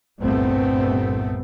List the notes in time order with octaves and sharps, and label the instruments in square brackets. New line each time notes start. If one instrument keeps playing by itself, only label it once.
[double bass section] G1 C2 A#2 A3 B3 C4